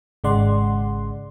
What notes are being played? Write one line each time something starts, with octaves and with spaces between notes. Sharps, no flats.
G#1 C#3 G#3 D5 F#5 C6